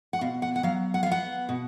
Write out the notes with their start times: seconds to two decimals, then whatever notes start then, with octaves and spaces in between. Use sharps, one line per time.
0.13 F#5
0.21 B2 F5
0.42 F#5
0.56 F#5
0.63 F#3 F5
0.94 F#5
1.03 F5
1.06 B3
1.12 F#5
1.49 B2